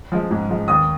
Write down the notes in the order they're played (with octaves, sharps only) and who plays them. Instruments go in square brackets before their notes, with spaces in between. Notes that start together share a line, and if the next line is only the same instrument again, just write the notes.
[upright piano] F3 G#3
G#2
F3 G#3
D#2 D#6